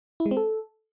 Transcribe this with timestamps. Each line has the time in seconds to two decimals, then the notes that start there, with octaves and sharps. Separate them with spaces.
0.20 E4
0.26 G#3
0.31 C4
0.37 A4